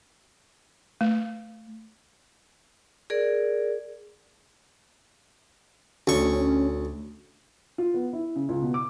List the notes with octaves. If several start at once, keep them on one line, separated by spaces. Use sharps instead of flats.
A3
G#4 A#4 D5
D2 C#4 C#6
F4
B3
E4
C#3
C#2
B2
D6